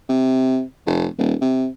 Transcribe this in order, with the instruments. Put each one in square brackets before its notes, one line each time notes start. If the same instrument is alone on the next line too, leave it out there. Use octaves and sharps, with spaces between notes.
[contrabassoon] C3
F1
D#1
C3